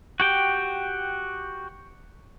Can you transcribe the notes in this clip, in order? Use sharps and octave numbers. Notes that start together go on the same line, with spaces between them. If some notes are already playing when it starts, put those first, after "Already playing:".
F#4 G4 G5